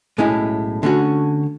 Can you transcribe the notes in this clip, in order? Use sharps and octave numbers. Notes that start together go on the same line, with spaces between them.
B1 A2 G#3 C#4 E4
D3 A3 C#4 F#4